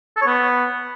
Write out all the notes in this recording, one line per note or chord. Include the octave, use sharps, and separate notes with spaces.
A4
C#5
B3